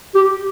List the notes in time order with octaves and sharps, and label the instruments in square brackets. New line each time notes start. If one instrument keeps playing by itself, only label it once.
[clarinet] G4